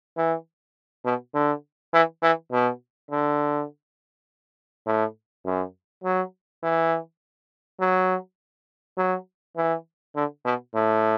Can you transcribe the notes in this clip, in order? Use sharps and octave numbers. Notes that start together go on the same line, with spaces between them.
E3
B2
D3
E3
E3
B2
D3
A2
F#2
F#3
E3
F#3
F#3
E3
D3
B2
A2